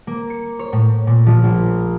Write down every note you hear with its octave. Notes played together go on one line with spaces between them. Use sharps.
A#3
C#7
C#5
A2
A#2
F3
A#1